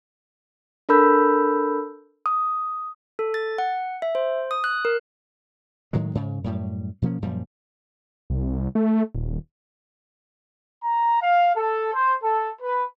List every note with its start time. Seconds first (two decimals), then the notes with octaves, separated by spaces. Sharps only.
0.89 D4 A4 A#4 B5 E6 G6
2.26 D#6
3.19 A4
3.34 A6
3.58 F#5
4.02 E5
4.15 C5
4.51 D#6
4.64 F#6
4.85 A#4
5.93 A2 D#3 F#3 G#3
6.15 G#2 C#3
6.44 F#2 A2 G3
7.02 B2 F3 A#3 C#4
7.22 F#2 A#2 F3 G3
8.30 C2
8.75 A3
9.15 D#1
10.83 A#5
11.21 F5
11.55 A4
11.93 C5
12.22 A4
12.61 B4